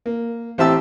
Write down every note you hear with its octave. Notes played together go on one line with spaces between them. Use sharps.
A#3
A1 C4 G4 E5 A5 E6